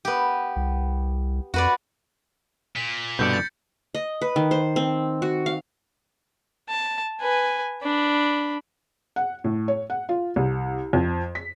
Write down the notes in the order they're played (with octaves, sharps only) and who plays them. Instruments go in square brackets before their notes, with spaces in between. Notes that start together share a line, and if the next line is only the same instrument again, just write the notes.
[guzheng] B3 G4
[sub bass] C2
[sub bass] F2 [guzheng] F#4 B4 D5
[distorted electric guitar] A#2 [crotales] B6
[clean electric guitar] C2 D3 D5 [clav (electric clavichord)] G2 B2 [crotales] G6 C#7
[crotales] A6
[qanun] D#5
B4
D#3
C5
C4
F#4
F5
[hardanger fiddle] A5
B4 G#5
D4 B5
[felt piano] F#5
A2
C#5
F#5
F4
C2
F2
B6